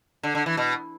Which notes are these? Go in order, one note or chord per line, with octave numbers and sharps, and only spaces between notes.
D3
D3
E3
B2